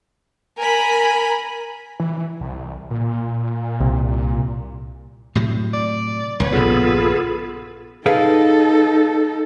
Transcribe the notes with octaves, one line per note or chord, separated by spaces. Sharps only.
A#4 G#5 A#5 B5
E3
C2
A#2
C2
A2 C3 F#3
D5
D#1 C2 B4 C#5
A#1 G2 C#3 B3 F4 G#4 A4
D#4 G#4 A4 B4 F5